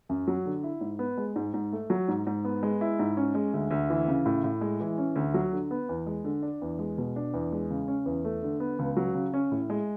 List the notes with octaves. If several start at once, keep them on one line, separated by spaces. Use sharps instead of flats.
F#2
F#3
D3
E4
G#2
B3
G#3
G#2
G#2
A3
F#3
G#2
G#2
B3
G#3
E4
G#2
C#4
G#3
D2
D2
E3
C#3
A2
A2
G#3
E3
C#4
D2
F#3
D3
B3
E2
G#3
D3
D4
E2
G#3
B2
D4
E2
G#3
C#3
C#4
E2
A3
D3
B3
C#2
F#3
C#3
C#4
A2
G#3